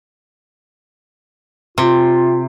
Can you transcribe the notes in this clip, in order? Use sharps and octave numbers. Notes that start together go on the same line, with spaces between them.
C3 F4